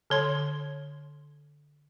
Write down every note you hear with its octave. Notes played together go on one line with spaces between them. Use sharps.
D3 C#5 C6